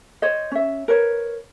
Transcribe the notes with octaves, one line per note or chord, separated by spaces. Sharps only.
C5 C#5 D#5
C#4 E5
A#4 B4 C#5